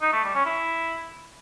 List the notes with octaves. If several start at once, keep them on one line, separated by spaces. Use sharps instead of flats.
D#4
A3
G3
C#4
E4